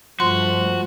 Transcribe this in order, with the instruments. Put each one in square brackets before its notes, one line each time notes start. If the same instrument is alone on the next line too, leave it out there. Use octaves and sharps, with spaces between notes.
[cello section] G2 A3 [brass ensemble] F3 [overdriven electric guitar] F#4 [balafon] C6